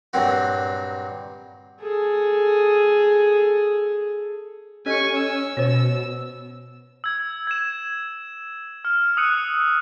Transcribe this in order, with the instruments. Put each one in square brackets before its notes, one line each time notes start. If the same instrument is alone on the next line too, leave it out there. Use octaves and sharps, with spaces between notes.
[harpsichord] G2 A#2 F#3 C4 F#4
[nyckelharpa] G#4 A4
[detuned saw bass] C#4 [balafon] G4 A4 D#5 [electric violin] G#5 C#6
[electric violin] E6
[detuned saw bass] B2 [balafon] C5 C#5
[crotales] E6 G#6
G#6 E7
F6
D#6 E6 F#6 C#7 D#7 F7